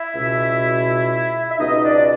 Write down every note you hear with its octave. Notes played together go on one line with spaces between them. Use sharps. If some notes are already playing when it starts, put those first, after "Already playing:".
Already playing: E4 E5
C#2 B2
E5
C#2 B2 D#4 D#5
D4 D5